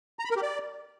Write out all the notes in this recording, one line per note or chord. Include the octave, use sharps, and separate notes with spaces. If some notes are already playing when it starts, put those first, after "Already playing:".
A#5
B5
A#4
G4
D5